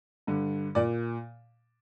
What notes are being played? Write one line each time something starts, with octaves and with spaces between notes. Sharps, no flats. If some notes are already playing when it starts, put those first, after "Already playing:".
G2 D3
A#2 D5